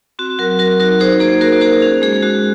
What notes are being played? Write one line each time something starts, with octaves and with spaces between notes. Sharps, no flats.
C4 F#4
F#3 F#4 A#4
F#4 A#4
D#4 F#4 A#4
D#4 G#4 C5
A#3 G#4 C5
A#3 F#4 A#4
F#4 G#4 C5
C#4 G#4
G#3 G#4
G#3 F#4